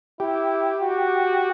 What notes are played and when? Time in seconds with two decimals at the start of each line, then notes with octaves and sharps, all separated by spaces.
0.20 E4 G4
0.82 F#4